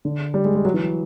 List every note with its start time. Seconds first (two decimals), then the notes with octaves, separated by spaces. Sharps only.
0.05 D3
0.34 G3
0.45 G#3
0.55 G#3
0.65 F#3
0.74 E3